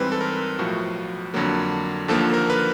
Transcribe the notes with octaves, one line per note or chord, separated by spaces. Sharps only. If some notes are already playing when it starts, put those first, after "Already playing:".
Already playing: G#2 E3 G3 C4 B4
A4
A#4
B1 A2 F3 F#4
F2 D3 F#3 A#3
D#2 D3 F3 A#3 A4
A#4
B4